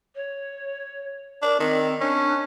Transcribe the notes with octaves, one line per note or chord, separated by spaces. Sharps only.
C#5
D4 A#4
D#3 C4
C#4 D4